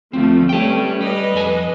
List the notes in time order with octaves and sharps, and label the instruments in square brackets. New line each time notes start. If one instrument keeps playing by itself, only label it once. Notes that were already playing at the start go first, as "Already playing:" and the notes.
[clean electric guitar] D2 C4 [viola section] F3 A3
[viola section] G3 A3 C#4 [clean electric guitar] B4 G5
[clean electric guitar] G3 [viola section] B4 D#5
[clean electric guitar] F2 A4 G#5